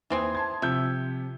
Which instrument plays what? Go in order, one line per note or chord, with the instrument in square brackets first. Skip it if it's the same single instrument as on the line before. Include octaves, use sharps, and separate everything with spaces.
[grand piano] D#2 [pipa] E3 C4 G#4
[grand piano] A5 C6 G#6
[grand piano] C3 F3 G6 [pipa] E5